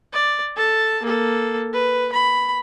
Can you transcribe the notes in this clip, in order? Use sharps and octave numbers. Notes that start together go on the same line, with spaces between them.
D5
A4 A5
A#3 A4
B4
B5